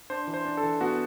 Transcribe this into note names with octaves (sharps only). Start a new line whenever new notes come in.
D4 C5
E3
C5
D4
A4
E3
B3 F#4